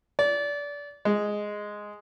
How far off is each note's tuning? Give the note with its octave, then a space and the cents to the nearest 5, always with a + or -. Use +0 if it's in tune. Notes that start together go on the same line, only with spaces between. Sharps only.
D5 -25
G#3 +0